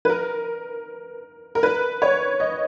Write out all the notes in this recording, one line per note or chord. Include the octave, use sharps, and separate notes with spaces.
B4
A#4
A#4
B4
C#5
D#5